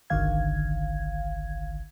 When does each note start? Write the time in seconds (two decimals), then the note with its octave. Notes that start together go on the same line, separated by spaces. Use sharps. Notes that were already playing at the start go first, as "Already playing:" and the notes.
0.10 G1 C2 D3 D#3 F5 G#6